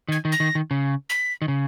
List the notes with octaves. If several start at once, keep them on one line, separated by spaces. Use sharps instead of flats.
D#3
G#6
D#3
A#6
D#3
D#3
C#3
B6
D#3
C#3